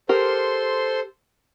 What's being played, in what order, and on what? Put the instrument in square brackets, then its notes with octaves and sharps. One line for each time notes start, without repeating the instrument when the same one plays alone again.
[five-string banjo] G4 A#4 [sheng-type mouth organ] A4 C5 C6